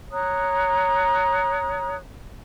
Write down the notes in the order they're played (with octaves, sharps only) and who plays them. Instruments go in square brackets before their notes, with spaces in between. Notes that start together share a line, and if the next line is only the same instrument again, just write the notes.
[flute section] C#5 A#5 D#6 F#6